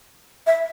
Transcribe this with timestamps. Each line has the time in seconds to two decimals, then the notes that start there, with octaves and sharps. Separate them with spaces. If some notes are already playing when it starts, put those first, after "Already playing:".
0.47 E5